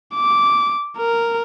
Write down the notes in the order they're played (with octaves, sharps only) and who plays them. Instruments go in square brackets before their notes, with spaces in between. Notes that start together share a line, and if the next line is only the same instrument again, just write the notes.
[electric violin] D6
A#4